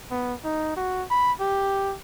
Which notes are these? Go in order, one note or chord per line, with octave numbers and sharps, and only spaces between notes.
B3
D#4
F#4
B5
G4